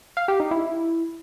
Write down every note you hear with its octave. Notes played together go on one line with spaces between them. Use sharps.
F5
G4
D#4
E4